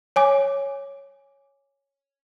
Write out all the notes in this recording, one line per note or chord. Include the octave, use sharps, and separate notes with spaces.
C#5 G#5 D6